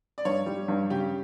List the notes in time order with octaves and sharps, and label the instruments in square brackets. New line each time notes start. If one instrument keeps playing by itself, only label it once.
[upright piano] D5
[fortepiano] G2 [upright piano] C#5
[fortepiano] G3
G2
[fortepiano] C#3 [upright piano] G4